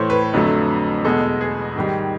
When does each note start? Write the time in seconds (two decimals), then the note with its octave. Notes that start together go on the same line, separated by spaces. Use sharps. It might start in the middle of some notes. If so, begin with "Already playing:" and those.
Already playing: A2 E3 A3 C5 C#5
0.10 B4
0.33 F2 D3 F#3 A3
1.04 E2 B2 G#3 A4
1.41 G#4
1.76 G#2 D#3 G3